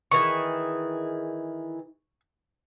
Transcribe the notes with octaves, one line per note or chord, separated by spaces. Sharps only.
D#3 E3 G#4 C#6